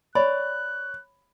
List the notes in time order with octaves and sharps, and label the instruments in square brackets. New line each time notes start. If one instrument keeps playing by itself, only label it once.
[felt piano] C#5 [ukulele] D5 [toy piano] B5 [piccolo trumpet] F#6